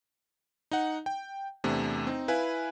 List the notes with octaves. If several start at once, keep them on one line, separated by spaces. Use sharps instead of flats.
D#4 F#5
G5
E2 C3 A3 D4
C4 D#4
E4 B4 F5 G#5